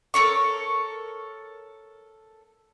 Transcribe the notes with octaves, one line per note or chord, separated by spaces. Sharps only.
A4 A#4 C#5 C#6